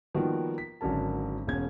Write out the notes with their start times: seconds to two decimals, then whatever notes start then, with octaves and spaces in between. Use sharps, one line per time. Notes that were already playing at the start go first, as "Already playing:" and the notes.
0.15 D#3 F3 G3 A#3 B3 F#4
0.58 B6
0.81 G#1 D3 F#3 C#4 A#4 A5
1.47 E1 C#4 G#6